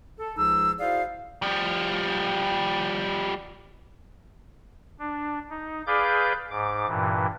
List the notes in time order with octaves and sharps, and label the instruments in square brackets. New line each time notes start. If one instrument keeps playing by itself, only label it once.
[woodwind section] A4
C#2 F3 D#4 G#4 E6
E4 F#4 G#4 C5 D5 F5
[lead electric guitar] F3 G3
[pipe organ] D4
D#4
G#4 B4 D5 F5 D6 G6
G#2 D6
G2 A#2 E3